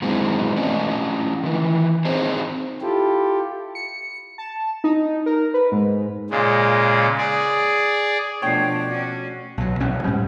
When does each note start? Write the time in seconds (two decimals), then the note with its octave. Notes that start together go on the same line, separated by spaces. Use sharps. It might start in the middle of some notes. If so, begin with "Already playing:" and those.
0.02 F#2 D#3 G#3 C4 E4
0.56 A3 C#4 D4 D#5
1.43 D#3 E3
2.05 C4 D#4 G#4 C5 C#5
2.81 E4 F4 G4 A4
3.75 C#7
4.38 A5
4.84 D#4
5.26 A#4
5.54 B4
5.72 G#2
6.30 A#2 C#3 G#3
7.18 G#4 D5
8.42 B2 F3 A3 D4 C#5 G5 G#6 C7
8.86 C#4 F#4
9.58 B1 F#3
9.80 B1 B2 C#4
10.04 G#2 G3